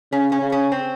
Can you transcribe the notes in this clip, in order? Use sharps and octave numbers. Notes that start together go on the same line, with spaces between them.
C#3 C#4
C#4
C#3
C#4
C4